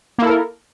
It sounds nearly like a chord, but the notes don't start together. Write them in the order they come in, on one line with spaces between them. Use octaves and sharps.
A#3 E4 A4 A#4